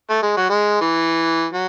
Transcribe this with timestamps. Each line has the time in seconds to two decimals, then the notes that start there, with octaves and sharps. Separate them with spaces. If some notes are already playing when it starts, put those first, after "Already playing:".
0.10 A3
0.23 G#3
0.37 F#3
0.50 G#3
0.81 E3
1.53 F#3